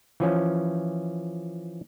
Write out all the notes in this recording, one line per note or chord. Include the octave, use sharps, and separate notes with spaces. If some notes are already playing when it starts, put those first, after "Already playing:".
E3 F3 C#4